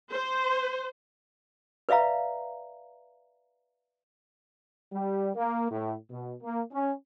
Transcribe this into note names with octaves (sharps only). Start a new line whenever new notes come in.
C5
B4 D5 E5 F5 A#5
G3
A#3
A2
B2
A#3
C#4